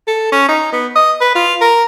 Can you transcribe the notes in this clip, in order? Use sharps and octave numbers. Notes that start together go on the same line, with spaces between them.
A4
C#4
D#4
B3
D#5
B4
F4
A#4